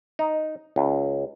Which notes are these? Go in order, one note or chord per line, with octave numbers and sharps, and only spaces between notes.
D#4
C#2